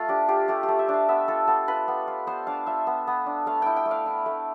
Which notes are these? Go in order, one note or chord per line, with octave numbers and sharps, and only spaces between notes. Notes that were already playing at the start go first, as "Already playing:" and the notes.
Already playing: A3 F4
D4 G4
F4 G4
A3 G4
G4
A3
E5
D4
F5
B3 E5
F4 A4
B3 A4
F4 B4
B3
F4
B3 C5
D4 F5
F4 E5
B3
B3
D4
A3 F5
E4 G5
G5
A3
F5
E4
A3